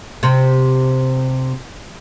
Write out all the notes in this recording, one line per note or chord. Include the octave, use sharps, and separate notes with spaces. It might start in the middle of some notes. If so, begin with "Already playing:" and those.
C3 C4